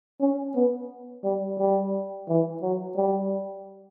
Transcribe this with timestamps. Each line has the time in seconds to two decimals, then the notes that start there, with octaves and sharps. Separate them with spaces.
0.21 C#4
0.55 B3
1.24 G3
1.59 G3
2.28 E3
2.62 F#3
2.96 G3